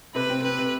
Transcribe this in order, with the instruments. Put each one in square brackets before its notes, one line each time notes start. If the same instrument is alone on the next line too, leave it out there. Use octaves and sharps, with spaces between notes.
[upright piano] C3 [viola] B4
[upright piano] C4
[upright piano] C4 [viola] B4
[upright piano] C3